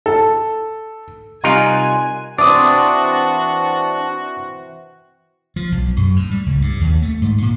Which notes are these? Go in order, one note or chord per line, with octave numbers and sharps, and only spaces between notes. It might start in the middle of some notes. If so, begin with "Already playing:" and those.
A4
C3 G3 D#4 F4 A#4 G#5 F#6
E3 C4 D4 F#4 D6 D#6
F3
B1
F#2
A2
G3
C#2
G2
D#2
A3
G#2
A#2